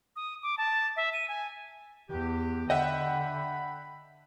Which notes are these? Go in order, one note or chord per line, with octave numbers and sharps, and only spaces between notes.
D#6
D6
A5
E5
D#7
G#5
E2 G4
D3 D#5 E5 F#5 G5 B5